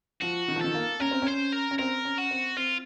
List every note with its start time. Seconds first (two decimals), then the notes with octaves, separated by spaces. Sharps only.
0.21 F3 F#4
0.48 D#3
0.56 F3
0.61 D#3 A4
0.74 A#3
1.00 C#4 A#4
1.11 C4
1.22 C#4 C5
1.52 A#4
1.71 C#4
1.78 C4 A#4
2.05 C#4
2.18 F#4
2.31 C4
2.57 C4 F4